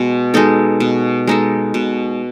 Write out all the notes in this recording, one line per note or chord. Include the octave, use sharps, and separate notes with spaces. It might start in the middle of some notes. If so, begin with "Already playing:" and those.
Already playing: B2 G#3
G#3 D#4 A4
B2
G#3 D#4 A4
B2